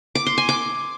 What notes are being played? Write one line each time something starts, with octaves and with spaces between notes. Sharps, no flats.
D6
C6
G#5
D6